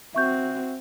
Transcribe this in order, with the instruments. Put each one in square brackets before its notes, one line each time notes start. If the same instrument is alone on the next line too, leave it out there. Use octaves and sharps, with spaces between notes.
[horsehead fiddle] C4 F#4 [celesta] E5 C#6 G6